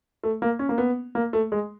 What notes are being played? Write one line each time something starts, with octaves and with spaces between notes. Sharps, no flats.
A3
A#3
C#4
A#3
B3
A#3
A3
G#3